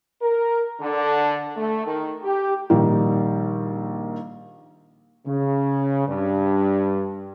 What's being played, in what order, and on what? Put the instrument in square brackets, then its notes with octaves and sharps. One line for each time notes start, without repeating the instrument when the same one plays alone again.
[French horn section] A#4
D3
A3
D#3
G4
[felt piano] A#1 D#3 G3
[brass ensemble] C#3
G2